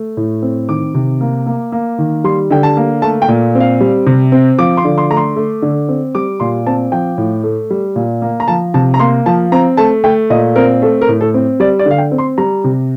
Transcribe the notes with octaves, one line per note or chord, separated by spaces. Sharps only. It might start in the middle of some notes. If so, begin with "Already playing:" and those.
Already playing: A3
A2
C4
D#3 D6
C3
A#3
A#3
A#3
D#3
G3 C6
D3 G5
A5
A#3
A3 A5
G5
A#2
C4
F5
G3
C3
C4
F3 D6
C6
D3
C6
A3 A#5
C6
A3
D3
C4
G3 D6
A#2 C6
C4 A5
F3 G5
A2
A3
G3
A#2
A#3
A#5
F3 A5
C3 A5
A#5
A#3 C6
F3 A5
C4 A#5
A3 A5
A3 G5
A#2 D#5
C4 A#4
A3 A4
A#4
A2
A4
C4
G3 D5
D5
D3 F5
G5
C4
C6
G3 A#5
C3